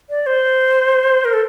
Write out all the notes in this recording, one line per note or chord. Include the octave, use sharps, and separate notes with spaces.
D5
C5
A#4
A4